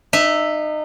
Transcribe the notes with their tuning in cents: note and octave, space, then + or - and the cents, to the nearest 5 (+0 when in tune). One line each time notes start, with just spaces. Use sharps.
D#4 -30 E5 +0